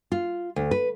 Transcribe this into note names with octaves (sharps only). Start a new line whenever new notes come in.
F4
D2
B4